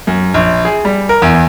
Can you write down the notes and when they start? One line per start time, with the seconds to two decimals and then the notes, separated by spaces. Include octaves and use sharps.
0.07 F#2
0.34 A#1
0.65 G#4
0.85 G3
1.09 A#4
1.22 E2